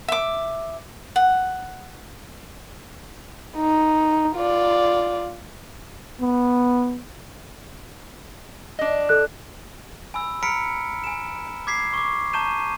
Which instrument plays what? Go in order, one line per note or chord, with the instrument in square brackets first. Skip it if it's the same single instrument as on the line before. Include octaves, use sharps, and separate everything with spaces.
[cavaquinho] E5 D6
F#5
[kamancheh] D#4
F4 D5
[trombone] B3
[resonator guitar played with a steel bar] D4 D#5
[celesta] A4 F#6
[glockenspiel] G#5 B5 E6
A#5 B5 F6 B6 C#7 D7
G#5 E7
D6 G#6 B6 C7
C#6 D6
A5 A#5 C#6 G6 D#7 E7